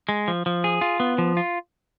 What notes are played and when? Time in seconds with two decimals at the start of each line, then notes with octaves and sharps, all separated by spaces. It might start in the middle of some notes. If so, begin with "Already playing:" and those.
0.09 G#3
0.28 F3
0.46 F3
0.64 G#4
0.81 F4
1.00 B3
1.18 F3
1.37 F4